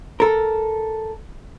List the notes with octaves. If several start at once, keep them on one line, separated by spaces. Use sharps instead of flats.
A4 A#4